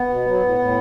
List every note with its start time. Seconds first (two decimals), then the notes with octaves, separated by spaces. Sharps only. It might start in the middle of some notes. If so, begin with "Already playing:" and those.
Already playing: B3
0.09 B2
0.26 F#3
0.43 A2
0.58 A2